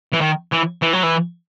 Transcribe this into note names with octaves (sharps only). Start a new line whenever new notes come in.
E3
D#3
E3
E3
F#3
E3